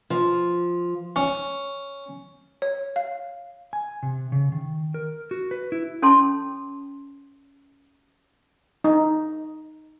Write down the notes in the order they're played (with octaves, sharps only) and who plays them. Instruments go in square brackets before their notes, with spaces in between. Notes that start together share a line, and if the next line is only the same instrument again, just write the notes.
[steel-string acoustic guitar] F3
[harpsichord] C#4
[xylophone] C#5
F5
[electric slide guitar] G#5
C3
C#3
D#3
A#4
F#4
B4
E4
[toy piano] C#4 A4 C#5 G5 A5 C6
[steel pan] D#4